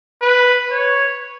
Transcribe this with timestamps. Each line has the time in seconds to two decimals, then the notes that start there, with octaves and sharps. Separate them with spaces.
0.21 B4
0.71 C#5